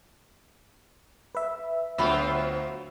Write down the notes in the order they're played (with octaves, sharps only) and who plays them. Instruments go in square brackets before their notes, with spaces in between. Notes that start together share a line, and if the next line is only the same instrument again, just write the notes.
[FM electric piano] B4 E5
[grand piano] D2 [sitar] F#3 B3 F4 [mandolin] C4 B5 E6